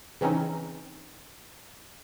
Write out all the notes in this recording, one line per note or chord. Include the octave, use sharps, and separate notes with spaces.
C#3 E3 C4 C#4 D#4